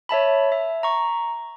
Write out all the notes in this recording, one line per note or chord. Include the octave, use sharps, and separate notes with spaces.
C#5 E5 A5 B5
E5
A#5 C#6